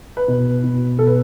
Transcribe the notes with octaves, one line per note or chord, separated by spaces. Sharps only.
B4
B2
B2
B2 A4
B4